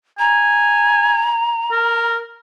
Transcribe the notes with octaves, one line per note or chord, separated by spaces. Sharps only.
G#5 A#5
A#4